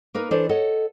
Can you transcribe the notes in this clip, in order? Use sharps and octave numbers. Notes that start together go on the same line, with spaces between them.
A#3 D#4 A#4 B4
E3 D4 A4 C5 D5
A4 C#5 D#5 F#5